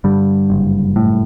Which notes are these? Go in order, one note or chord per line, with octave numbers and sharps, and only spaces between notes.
G2 D3 G3
F#1
A2